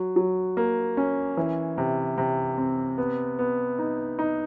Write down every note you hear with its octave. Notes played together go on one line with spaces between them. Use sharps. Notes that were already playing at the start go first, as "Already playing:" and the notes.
Already playing: F#3
F#3
A#3
C#4
E3
C3
C3
C4
B3
B3
D#4
D#4